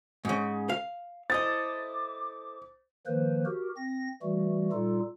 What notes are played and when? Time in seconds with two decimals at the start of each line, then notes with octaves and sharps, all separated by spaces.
0.25 G#2 C#3
0.69 F5
1.30 E4 A4 C5 D#5 D6 D#6 A6
3.06 D#3 F3 A#3 B4 C5
3.46 F#4 G4 A#4
3.77 C4 A#6
4.22 E3 G3 A3 F#4
4.72 A#2 G3 D#4 F4 A4